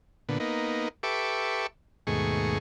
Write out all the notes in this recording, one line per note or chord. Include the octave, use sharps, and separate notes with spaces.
A#2 D3 B3
A#3 B3 D#4
G4 A4 B4 E5 C#6 D6
D#2 G#2 B2 A3 G#4 C#6